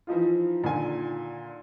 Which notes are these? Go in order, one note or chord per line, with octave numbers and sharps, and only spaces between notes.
E3 F3 D#4 F4
A#2 D3 D#3 G#5